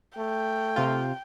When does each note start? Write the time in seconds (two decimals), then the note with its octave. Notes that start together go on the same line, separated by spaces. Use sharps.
0.18 A3 G5
0.76 C3 F4